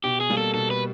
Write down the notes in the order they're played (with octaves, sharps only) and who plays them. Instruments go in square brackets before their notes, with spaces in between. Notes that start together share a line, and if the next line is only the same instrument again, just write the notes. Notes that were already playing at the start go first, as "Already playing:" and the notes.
[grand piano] B2 [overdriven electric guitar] G4
[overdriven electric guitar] G#4
[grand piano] G3 A#3
[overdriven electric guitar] A4
[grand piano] B2 [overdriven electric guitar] A4
[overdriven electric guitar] B4